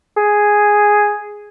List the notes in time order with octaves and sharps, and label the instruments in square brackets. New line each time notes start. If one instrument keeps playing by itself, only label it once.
[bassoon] G#4